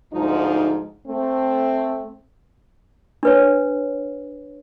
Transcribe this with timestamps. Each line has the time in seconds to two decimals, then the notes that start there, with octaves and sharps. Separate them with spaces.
0.13 D2 G#2 F3 D#4
1.07 A3 C4
3.23 D4 B4 C#5